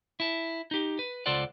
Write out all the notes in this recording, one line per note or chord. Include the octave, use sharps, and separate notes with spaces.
E4 A5
D#4 G4
B4
C#2 F4 A4 C5 D5 F#5